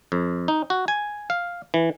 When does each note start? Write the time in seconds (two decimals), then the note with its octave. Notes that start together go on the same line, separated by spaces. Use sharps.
0.12 F2
0.48 D#4
0.70 F#4
0.88 G#5
1.30 F5
1.74 E3